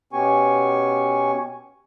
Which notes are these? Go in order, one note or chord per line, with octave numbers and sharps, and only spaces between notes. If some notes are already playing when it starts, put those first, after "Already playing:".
B2 B3 C#4 G4 G#5 C#6